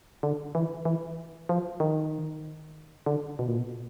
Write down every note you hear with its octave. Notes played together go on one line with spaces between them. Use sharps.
D3
E3
E3
F3
D#3
D3
B2
A#2
B2